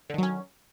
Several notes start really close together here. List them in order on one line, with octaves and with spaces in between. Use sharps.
D3 D#3 F#3 C#4